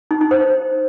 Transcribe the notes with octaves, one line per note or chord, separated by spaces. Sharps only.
D#4
D#4
C5